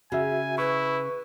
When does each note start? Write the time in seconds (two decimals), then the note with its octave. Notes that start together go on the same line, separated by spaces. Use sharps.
0.12 C#3 F#4 E5 G#5
0.58 E4 B4 C#6